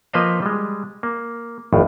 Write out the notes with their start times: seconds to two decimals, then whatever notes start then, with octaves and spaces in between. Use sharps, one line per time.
0.13 F3 A#3 B4 C5 D#5 F5
0.42 G3 G#3
1.03 A#3
1.73 G#1 F2 A2